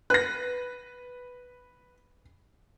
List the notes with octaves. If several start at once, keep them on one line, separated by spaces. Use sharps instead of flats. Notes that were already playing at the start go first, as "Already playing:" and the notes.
B4 F#6 A#6